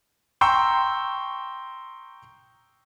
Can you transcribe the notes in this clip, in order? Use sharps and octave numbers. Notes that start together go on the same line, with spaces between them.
G5 A#5 C6 C#6 E6 G6